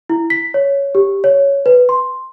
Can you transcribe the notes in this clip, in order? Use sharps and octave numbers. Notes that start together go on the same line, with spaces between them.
E4
B6
C#5
G4
C#5
B4
C6